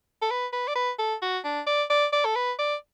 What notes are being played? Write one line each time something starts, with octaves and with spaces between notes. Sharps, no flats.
A4
B4
B4
D5
B4
A4
F#4
D4
D5
D5
D5
A4
B4
D5